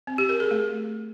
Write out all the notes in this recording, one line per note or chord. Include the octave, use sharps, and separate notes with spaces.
C4
G4
A#4
G#4
A3